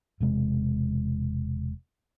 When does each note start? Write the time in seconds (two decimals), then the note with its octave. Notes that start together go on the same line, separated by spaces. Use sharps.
0.20 E1 C3 G#3